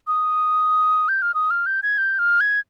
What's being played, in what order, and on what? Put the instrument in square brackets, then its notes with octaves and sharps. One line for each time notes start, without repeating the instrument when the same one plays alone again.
[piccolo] D#6
G6
F6
D#6
F6
G6
G#6
G6
F6
G#6